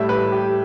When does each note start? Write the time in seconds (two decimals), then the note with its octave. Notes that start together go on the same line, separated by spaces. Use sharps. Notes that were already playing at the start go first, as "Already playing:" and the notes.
Already playing: A2 G3 E5
0.09 B4
0.32 G4